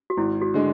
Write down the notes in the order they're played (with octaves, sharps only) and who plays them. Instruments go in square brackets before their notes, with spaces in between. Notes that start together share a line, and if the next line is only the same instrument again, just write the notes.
[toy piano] F#4
[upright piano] G#1 [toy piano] E4
[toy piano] F#4
[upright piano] D3 G#3